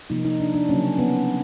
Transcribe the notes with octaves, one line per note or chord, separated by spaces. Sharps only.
C3 F3 A#3 D#4
D#4
D4
D4
C#3 F#3 A#3 C#4
B3